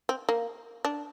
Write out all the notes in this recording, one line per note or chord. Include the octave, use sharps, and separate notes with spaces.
C4
A#3
D4